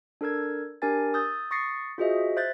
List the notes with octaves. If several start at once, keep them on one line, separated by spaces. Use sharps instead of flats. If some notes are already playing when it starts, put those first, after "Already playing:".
D4 A4 A#4 E6 G#6
D4 G4 A#4 G#5 A6
D#6 E6 G6 A6
C#6 D#6 A6 A#6 C7 C#7
F4 F#4 G#4 C5 D#5 E5
C5 E5 F#6 G6 A6